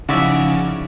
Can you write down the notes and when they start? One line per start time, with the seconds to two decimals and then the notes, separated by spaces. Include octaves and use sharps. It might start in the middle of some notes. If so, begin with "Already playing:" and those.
0.09 C#3 F3 D#4 E4 F#4 D5 E5